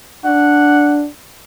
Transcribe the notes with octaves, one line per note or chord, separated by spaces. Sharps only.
D4 F#5